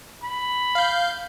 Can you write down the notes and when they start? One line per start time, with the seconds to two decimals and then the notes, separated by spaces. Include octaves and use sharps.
0.24 B5
0.75 F5 G6